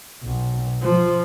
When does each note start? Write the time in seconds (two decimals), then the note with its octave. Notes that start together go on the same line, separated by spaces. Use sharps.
0.22 B1
0.82 F3